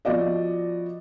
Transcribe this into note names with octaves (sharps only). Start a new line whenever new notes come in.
F3 B3 F#4 D5 D#5